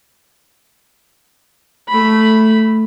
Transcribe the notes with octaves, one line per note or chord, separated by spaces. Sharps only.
A3 B5